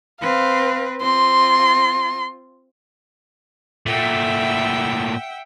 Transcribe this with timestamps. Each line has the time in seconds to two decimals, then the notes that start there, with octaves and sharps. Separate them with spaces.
0.21 C4 B4 F5
1.02 C4 F4 C6
3.86 A#2 A3 E5 F#5 G5